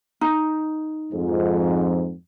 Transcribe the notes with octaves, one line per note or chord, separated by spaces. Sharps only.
D#4
F2 G#2